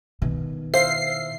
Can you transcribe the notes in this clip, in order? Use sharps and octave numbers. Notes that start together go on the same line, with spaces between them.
B2 D#3
C5 E5 F5 C7